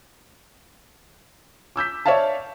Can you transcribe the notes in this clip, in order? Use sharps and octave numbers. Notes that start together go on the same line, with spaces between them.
D6 E6 G6 B6
C#5 D5 E5 F5 A5